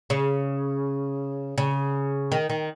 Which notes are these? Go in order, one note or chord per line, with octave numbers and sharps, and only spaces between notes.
C#3
C#3
D#3
D#3